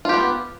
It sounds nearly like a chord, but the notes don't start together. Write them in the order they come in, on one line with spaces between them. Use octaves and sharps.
F4 G4 B3